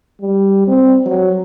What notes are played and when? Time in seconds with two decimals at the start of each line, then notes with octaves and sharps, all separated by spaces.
0.21 G3
0.67 C4
1.06 F#3